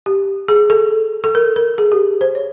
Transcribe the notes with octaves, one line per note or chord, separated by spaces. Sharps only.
G4
G#4
A4
A4
A#4
A#4
G#4
G4
C5
C#5